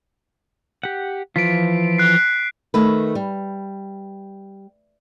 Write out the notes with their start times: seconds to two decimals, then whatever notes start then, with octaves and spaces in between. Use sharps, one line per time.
0.83 G4 F#5
1.36 E3 F3 F4 B6 D7
1.98 F#6 C7
2.74 D#3 A3 B4
3.15 G3